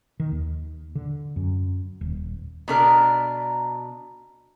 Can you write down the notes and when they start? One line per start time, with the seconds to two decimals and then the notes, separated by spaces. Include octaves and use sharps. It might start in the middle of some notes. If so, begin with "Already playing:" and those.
0.20 D#3
0.32 D#2
0.95 D3
1.36 F#2
2.01 D#1
2.68 B2 D4 A#4